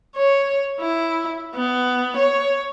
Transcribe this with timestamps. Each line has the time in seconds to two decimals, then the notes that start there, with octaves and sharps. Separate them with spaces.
0.16 C#5
0.80 E4
1.55 B3
2.17 C#5